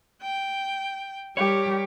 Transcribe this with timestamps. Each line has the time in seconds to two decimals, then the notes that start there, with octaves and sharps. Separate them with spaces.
0.22 G5
1.37 G3 G4 A#4 C#5